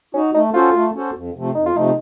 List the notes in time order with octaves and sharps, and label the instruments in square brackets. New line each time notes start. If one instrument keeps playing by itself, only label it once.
[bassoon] C#4 [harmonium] D#4 F#4
[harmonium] A3 [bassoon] D#4
[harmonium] C#4 F#4 A4 C5 [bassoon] F4
[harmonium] A3
C#4 F#4 A4 C5
F2
C3 F3 A3
[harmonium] F2 [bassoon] D#4
[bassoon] F4
[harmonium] C3 F3 A3 [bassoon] D#4